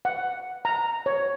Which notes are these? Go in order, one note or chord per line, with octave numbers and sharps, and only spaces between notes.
F#5
A#5
C#5